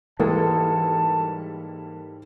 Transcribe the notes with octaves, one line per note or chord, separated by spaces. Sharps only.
G#2 E3 G3 A#3 A4 A5